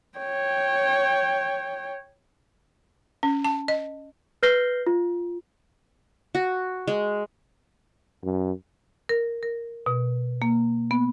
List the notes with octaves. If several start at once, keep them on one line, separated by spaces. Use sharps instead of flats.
C#5 G5
C#4
A5
D#5
B4 F6 G6 A#6 C7 G7
F4
F#4
G#3
F#2
A#4
A#4
B2
A#3
B3